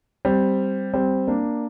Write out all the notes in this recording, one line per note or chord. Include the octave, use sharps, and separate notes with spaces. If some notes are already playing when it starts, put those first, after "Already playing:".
G3 C4
G3 C4
A#3 D4